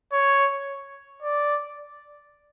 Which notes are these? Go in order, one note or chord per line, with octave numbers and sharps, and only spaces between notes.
C#5
D5